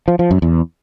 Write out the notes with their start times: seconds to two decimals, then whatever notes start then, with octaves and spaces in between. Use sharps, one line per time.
0.08 F3
0.19 F3
0.31 F#2
0.42 E2